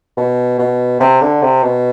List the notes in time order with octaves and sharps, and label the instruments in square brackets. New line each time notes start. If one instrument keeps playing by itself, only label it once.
[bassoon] B2
B2
C3
D3
C3
B2